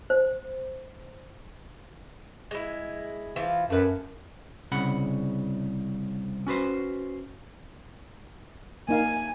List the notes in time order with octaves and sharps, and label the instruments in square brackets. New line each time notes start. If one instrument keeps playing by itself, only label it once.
[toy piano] C5
[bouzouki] G#3 E4
E3 F3 F4
[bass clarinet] F#2 [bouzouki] A3 B4
[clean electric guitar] C2 C#3 F#5 B5
C#4 F#4 B4 C5
[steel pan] A#3 D#4 F5 [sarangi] G#5